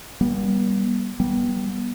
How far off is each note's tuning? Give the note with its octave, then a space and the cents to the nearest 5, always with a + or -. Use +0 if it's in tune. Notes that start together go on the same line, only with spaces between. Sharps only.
G3 +0 B3 -45
G3 -15 B3 -25